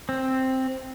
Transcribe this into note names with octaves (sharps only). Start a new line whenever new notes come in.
C4